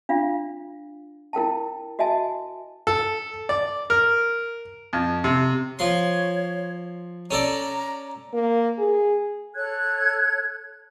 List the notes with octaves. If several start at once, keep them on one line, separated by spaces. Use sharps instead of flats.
D4 F4 F5
E4 A#4 G5 A5
F#4 D#5 E5 G#5 A5
A4
D5
A#4
F2
C3
F3 C#5 C6
C#4 A4 D5 A#5
A#3
G#4
A4 C#5 F#6 G#6